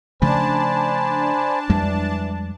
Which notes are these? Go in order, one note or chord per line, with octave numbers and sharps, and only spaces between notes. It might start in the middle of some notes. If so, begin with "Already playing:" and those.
C#3 F3 A3 D4 C5 G#5 A5 B5
F2 E3 G3 G#3